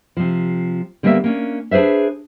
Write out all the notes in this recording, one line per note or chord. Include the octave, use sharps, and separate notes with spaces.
C3 F3
D3 G3 A#3 B3 D5 E5
A#3 C#4 D4
D4 G#4 B4 C5 E5